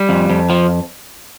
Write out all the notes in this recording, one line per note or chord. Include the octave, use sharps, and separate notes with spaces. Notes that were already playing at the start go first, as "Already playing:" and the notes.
Already playing: G3
F2
F2
F3